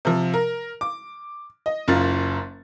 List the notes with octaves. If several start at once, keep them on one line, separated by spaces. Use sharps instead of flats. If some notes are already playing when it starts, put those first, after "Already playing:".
C3 F3
A#4
D6
D#5
F#1 F#2 F4 A6